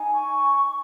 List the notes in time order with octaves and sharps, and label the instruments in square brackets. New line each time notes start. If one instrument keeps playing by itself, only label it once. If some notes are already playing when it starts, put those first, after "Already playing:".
Already playing: [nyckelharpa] D#4 [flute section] G#5
[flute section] C#6